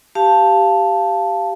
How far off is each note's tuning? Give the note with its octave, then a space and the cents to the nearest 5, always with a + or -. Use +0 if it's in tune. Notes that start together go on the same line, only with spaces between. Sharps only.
G4 +0 F5 -10 A5 +0